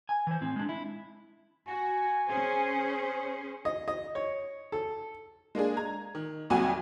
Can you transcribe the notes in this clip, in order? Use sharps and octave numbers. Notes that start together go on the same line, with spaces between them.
G#5
E3 C5
A2 C4
G#3 D4
E4
F#4 G#5
C#4 G#4 C5
D#5
D#5
C#5
A4
G#3 A#3 D4 G#4
A#5 G#6
D#3
C2 F2 F#3 F#4 F#5 G#5